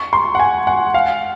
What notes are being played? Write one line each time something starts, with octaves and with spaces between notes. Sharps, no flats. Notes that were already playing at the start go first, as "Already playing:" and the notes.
Already playing: C#6
C6
F#5
G#5
F#5
F5